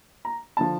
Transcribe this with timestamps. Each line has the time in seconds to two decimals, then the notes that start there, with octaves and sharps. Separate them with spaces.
0.25 A#5
0.57 D3 F3 A5